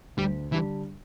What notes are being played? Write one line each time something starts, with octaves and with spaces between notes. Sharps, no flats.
D2 G3
D3 E3 G3 D4